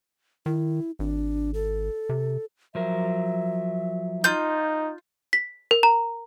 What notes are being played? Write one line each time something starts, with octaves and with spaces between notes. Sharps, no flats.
D#3 E4
G#1 D4
A4
C3
F3 F#3 A#4 E5
D#4 F4 G6
B6
A#4
A#5